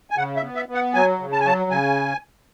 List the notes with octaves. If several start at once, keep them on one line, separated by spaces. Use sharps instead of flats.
G#5
C#3 F#5
E5
B3
E5
B3
F#5
F#3 G#5
C#3
A5
G#5
F#3 A5
C#3 G#5